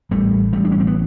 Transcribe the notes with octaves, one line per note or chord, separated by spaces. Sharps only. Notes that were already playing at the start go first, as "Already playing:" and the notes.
A1 G3 A3
A1 G3 A3
D4
C#4
C4
B3